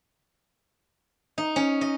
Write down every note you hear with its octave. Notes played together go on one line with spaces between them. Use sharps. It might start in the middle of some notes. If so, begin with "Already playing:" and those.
D#4
C#4
D#5